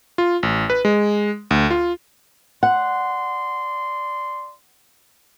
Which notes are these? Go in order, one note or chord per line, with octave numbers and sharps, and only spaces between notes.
F4
A1
B4
G#3
D2
F4
D5 F#5 C6